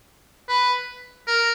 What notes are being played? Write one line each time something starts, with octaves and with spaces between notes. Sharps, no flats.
B4
A#4